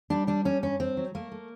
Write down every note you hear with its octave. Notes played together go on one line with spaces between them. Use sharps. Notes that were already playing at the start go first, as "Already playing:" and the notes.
G3 D4
G3 D4
G3 C#4
G2 C#4
G2 C4
F#3
A3 A#3
A3